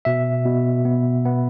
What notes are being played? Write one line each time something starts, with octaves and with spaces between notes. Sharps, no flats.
B2 E5
B2
B3
B3